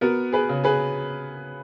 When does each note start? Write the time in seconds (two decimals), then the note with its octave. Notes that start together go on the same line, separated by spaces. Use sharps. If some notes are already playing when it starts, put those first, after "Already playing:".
0.01 B3 F#4 A#4
0.32 G#4 B4
0.49 C#3
0.64 G#4 B4